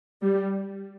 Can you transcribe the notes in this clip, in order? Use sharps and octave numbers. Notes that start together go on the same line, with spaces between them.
G3